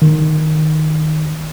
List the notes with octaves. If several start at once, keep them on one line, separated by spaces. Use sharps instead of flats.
D#3